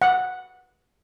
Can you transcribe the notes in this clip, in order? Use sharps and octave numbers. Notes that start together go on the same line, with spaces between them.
F#5